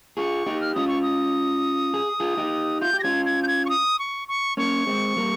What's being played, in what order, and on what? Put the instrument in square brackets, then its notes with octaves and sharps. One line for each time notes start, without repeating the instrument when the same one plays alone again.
[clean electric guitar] F4 G#4 [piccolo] C#6
[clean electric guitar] D#4 G4
[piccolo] F6
[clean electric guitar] C#4 F4 [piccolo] D#6
[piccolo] C#6
D#6
[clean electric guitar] G#4
F4 G#4
D#4 G4
[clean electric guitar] F4 [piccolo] G6
[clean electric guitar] G4
[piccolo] A#6
[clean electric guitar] C#4 F4 [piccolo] G#6
[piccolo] G#6
G6
G#6
C#6
D#6
C#6
C#6
[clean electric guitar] A#3 C#4 [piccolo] C#6
[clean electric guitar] G#3 C4
G3 A#3